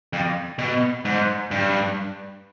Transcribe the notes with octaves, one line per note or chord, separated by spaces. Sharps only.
F2
B2
G#2
G2